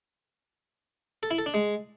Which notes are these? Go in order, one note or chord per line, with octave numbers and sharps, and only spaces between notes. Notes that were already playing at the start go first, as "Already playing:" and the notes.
A4
E4
A4
D4
G#3